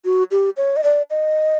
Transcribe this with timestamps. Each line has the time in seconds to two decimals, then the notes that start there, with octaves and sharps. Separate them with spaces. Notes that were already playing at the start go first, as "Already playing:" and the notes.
0.05 F#4
0.31 G4
0.57 C#5
0.76 D#5
0.84 D5
1.10 D#5